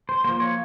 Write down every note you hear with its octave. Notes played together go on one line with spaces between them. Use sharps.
C5
F3 A#3 C5
C#5